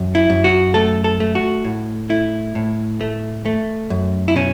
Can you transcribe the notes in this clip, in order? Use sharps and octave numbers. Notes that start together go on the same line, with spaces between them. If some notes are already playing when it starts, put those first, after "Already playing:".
Already playing: F#2
E4
F#2
F#4
A3 A4
A4
A3
F#4
A2
A3 E4
A2
A3
A3
F#2
E4
B2 C#4